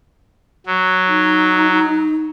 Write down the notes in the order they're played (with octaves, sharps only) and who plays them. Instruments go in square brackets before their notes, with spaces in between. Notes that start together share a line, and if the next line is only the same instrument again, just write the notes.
[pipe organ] F#3
[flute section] D#4